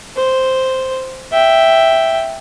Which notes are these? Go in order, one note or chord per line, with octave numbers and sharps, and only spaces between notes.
C5
E5 G5